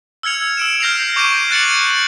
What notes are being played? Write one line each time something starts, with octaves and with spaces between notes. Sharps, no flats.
E6 F6 G#6 C#7 F7
E6 D7 E7
F6 G6 A#6 C7 E7 F7
C#6 D6 G6 A#6 D7 D#7
F#6 A6 C#7 F#7